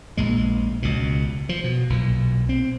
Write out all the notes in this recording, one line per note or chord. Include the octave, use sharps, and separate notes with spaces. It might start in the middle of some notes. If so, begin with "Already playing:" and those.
A#1 A#2 G#3
C#2 B2
F3
B2
B1 A#2
C4